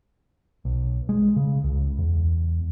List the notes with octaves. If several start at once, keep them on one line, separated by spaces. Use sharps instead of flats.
B1
G#3
C#3
C#2
E2